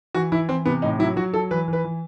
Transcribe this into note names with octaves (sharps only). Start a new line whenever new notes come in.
E3 F#4
E3 E4
E3 C4
C3 B3
A2 D#4
F#3 E4
F#3 F#4
F#3 A4
E3 B4
E3
B4
E3